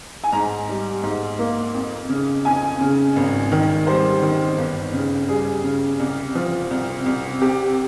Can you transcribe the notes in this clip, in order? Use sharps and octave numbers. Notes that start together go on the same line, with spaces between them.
G#5
G#2 A#5
G3
G#2
A#3
F2
C#3
F2 G#5
C#3
G#1
D#3
G3 C5
D#3
G1
C#3
G3 G#4
C#3
C2
F3
C2
C2
C3 G4